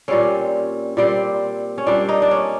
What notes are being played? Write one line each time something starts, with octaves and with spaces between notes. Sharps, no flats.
A#2 G3 C4 C#4
A#2 G3 C4
C#4
A#2 G3 C4 D4
D#4
D4
C#4